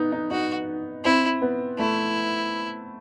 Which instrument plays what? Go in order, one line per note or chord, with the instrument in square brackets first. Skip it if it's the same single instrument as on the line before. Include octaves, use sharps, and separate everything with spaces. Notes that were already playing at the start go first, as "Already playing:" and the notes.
Already playing: [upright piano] B3 D#4
D#4
[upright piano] D#4 [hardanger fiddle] F#4
[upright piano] C4 [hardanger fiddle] E4
[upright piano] B3
[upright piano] A3 [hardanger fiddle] E4